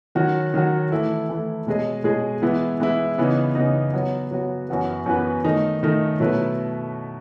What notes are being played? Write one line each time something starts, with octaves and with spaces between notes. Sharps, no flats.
D#3 F#3 C#4 F#4
D#3 F#3 C#4 F#4
E3 A3 E4 A4
E3 A3 E4 A4
B2 G#3 C#4 G#4 D#5
B2 G#3 C#4 G#4 D#5
E3 G#3 B3 E4
E3 G#3 B3 E4
C#3 E3 B3 D#4
C#3 E3 B3 D#4
F#3 B3 F#4
F#3 B3 F#4
F#2 E3 B3 F#4 B4
F#2 E3 B3 F#4 B4
D#3 A3 D#4
D#3 A3 D#4
B2 F#3 A3 E4 B4